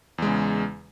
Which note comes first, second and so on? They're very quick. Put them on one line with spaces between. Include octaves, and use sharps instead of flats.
E2 G#3 C#3